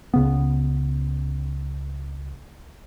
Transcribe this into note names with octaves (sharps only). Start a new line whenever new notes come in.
C#2 C#3 B3